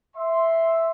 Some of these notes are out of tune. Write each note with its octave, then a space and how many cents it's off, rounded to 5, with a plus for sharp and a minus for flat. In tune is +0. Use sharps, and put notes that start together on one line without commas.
E5 +0 C6 +0